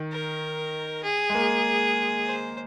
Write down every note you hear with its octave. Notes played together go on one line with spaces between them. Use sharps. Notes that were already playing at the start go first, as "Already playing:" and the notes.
Already playing: D#3
A#4
G#4
G#3
A#3
C5